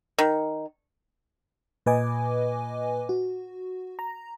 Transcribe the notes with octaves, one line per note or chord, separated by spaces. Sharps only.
D#3
A#2 B4 D#5 G#5 D6
F#4
A#5